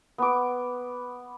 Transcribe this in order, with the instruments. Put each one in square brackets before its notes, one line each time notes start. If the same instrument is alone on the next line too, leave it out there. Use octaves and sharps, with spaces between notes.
[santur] B3 D6